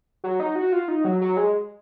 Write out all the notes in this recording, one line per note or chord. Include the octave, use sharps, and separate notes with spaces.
F#3
D#4
F#4
F4
D#4
F#3
F#3
G#3